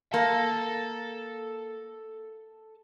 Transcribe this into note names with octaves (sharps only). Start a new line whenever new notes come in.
A#3 A4 A5